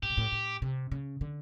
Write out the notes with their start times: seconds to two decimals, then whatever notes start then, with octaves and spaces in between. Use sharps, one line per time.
0.03 A2 G4
0.10 A#2
0.17 A2
0.32 A2
0.62 C3
0.92 C#3
1.21 D3